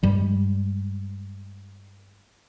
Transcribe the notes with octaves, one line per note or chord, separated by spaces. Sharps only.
G2 G3 G#3